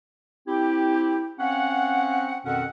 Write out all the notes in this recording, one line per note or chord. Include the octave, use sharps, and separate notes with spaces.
C4 E4 G4
C4 C#4 F5 F#5
F2 B2 D#3 C4 C#4 F#5